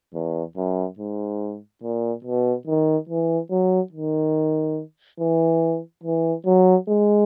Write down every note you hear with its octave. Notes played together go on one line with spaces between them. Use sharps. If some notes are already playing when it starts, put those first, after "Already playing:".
E2
F#2
G#2
A#2
B2
D#3
E3
F#3
D#3
E3
E3
F#3
G#3